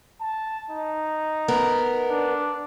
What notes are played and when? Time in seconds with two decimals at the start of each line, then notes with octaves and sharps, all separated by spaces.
0.21 A5
0.70 D#4
1.48 B3 A#4
2.10 D4